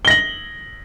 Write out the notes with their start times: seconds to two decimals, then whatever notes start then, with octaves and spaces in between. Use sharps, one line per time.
0.05 G7
0.07 A#6
0.10 F#7